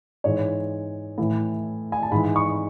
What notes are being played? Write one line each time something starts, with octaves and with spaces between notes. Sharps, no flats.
G#2 E3 C#5
A2 E3
G#5
A5
G#2 E3 B5
C#6